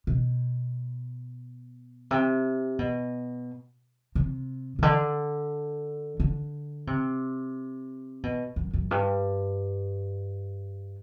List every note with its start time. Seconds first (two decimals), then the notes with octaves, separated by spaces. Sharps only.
0.07 B2
2.11 C3
2.79 B2
4.15 C3
4.79 C3
4.83 D3
6.20 D3
6.87 C3
8.23 B2
8.56 F#2
8.73 F#2
8.91 G2